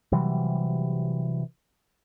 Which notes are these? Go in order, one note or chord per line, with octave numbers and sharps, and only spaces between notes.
C3 E3 F#3 G3